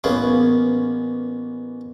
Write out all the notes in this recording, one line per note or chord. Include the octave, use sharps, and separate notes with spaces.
A1 A#3 B3 C#4 G#4